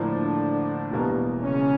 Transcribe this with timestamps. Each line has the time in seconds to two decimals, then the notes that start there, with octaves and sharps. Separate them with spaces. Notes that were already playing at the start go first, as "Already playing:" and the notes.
Already playing: A2 D3 F3 A#3 D4
0.91 E1 E2 B2 G3 A#3
1.43 C#3 C#4